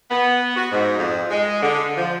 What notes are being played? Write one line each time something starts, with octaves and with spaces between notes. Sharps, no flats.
B3
F#4
G#2
F2
G#3
D3
F3